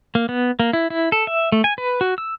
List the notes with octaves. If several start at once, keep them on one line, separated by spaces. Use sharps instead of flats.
A#3
B3
A#3
E4
E4
A4
E5
A3
G#5
B4
F#4
E6